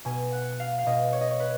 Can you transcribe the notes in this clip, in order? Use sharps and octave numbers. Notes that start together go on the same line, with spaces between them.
B2 G#5
F#5
F5
F5
B2 D#5
C#5
D#5
C#5
B4